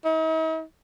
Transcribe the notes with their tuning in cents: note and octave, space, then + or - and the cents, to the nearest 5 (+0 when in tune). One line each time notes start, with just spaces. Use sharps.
D#4 +45